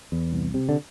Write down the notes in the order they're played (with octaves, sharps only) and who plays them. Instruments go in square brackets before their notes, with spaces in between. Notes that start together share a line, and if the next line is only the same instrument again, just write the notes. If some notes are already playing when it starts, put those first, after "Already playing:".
[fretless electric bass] E2
C2
C3
D3